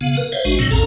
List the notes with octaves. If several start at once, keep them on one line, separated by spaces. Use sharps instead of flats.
C#3 B3 F5
A#4 B4
C5 C#5 E5 F5
G#1 G#3 D4 F#4
A2 C3 F#3 C4
A#1 F2 A2 C#4 A4 A#5